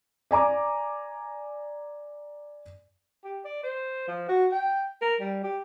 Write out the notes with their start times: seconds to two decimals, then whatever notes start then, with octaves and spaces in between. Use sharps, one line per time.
0.31 D5 G#5 A#5 D6
3.24 G4
3.45 D5
3.63 C5
4.08 F3
4.29 F#4
4.52 G5
5.01 A#4
5.20 G3
5.43 G4